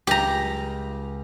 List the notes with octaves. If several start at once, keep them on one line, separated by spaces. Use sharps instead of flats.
C#2 G4 A#5